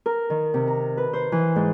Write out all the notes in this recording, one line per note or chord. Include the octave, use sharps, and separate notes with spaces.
A#4
D#3
C3
A#5
B4
C5
E3
G#2